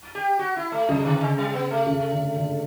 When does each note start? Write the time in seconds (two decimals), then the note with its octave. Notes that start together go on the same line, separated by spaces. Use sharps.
0.15 G4
0.39 F#4
0.56 E4
0.72 A3
0.88 C#3 F#3
1.05 D3
1.16 D3
1.20 C#3
1.38 G3
1.53 B3
1.71 A3
1.86 C#3
2.11 D3
2.36 D3